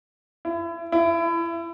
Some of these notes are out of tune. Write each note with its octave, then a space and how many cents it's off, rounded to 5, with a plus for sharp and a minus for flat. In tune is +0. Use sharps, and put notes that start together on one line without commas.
E4 +35
E4 +30